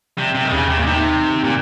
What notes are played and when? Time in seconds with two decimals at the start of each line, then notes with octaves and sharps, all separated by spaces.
0.17 C3 G3
0.35 C3
0.45 D#3
0.52 D#2 C#3
0.69 C3
0.79 A#2
0.86 C3 D#4
1.20 D#3
1.44 A#2